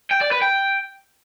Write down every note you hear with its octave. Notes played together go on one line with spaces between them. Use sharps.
G5
D5
B4
G5